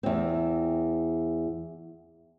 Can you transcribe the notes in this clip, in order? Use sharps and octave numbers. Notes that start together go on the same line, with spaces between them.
E2 C4